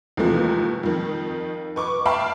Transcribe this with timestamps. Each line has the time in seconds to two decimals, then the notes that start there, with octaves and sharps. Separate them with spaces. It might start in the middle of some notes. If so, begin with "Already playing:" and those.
0.17 D#2 C3 E3 F3 G#3 A3
0.83 F2 D#3
1.76 B4 C#6 D6
2.06 E5 F5 G5 A5 B5